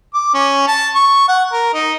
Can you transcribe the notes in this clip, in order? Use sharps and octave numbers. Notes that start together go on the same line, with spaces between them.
D6
C#4
A5
C#6
F#5
A#4
D#4